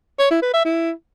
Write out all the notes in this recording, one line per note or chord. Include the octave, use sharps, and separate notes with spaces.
C#5
E4
B4
E5
E4